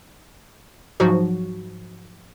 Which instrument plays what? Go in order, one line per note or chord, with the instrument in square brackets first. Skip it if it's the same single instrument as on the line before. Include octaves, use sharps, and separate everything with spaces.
[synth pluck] G#2 F3 F#3 F#4